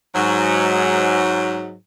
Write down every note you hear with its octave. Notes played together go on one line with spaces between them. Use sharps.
G#2 F#3